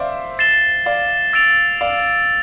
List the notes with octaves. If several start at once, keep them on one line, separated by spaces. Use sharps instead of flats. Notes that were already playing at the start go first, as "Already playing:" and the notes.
Already playing: C5 D5 E5 F5 D6
A6 C7 E7 G7
D5 F5
E6 A6 D7 F7
D5 F5